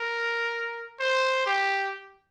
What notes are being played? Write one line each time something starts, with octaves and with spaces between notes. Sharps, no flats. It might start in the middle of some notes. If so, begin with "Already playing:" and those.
Already playing: A#4
C5
G4